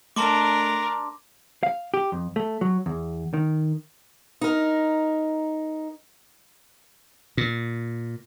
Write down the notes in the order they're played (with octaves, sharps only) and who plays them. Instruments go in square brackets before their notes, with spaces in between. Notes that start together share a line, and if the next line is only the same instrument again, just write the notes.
[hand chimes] A3 [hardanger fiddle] D4 A#4 [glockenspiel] A5 C6 D6
[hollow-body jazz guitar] F5
G4
F2
A3
F#3
E2
D#3
[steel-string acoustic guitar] D#4 A#4
[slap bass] A#2